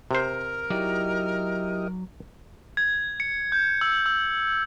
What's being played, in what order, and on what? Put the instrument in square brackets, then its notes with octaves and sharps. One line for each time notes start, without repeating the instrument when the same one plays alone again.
[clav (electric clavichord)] C3 C5 [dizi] A#4
[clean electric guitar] F#3 D#4 D5 [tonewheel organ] E4 G4 D#5
[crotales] G#6
C#7
G6
E6
E6